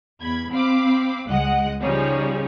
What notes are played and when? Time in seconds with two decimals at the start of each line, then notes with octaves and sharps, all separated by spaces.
0.20 E2 B5 G#6
0.51 C4 F5 B5 D6
1.28 C#2 G#3 D#5 F#5 F#6
1.81 C#3 F3 G3 D#4 G#4 C#5